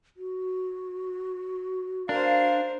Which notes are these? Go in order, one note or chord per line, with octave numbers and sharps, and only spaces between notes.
F#4
D4 A#4 C5 F5